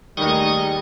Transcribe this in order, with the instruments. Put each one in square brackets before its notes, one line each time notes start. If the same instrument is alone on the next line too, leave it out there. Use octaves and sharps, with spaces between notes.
[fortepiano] D#2 D#3 [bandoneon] G3 [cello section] A3 D#4 G#4 [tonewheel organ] C#6 D#6